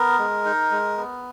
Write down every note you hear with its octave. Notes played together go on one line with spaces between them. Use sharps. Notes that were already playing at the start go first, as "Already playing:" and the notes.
Already playing: B3 A#4
G#3
D#4
G#3
B3